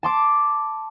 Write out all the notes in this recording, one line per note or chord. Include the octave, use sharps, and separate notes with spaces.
A5 C6 D6